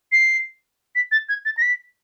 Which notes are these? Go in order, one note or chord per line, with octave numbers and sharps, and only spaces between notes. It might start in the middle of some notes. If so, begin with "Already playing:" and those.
C7
B6
A6
G#6
A6
A#6
B6